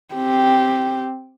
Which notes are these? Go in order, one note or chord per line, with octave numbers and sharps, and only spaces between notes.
C4 G4